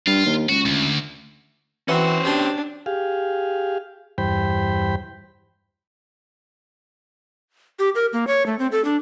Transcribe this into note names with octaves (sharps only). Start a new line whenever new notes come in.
G2 F4
D#2
C#2 F#4
D2
E3 C4 C#4 F#4 C5
D4 G4 C6 D#6
G4 G#4 F5
E2 G2 C5 G5 B5
G4
A#4
A#3
C#5
A3
C4
A4
D4